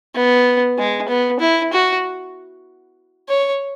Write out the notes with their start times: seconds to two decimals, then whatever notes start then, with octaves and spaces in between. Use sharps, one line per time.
0.15 B3
0.78 G#3
1.09 B3
1.40 E4
1.73 F#4
3.29 C#5